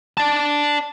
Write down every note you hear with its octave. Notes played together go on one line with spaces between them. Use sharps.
D5 A5